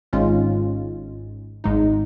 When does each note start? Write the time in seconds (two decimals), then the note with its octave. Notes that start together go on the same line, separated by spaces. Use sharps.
0.13 G#1 G#2 G#3 C#4 F4
1.64 G#1 G#2 G#3 D#4